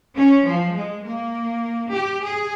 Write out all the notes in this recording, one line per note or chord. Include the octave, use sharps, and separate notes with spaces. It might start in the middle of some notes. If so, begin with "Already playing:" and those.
C#4
F3
G#3
A#3
G4
G#4